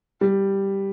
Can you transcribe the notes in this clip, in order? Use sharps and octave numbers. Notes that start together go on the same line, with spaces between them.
G3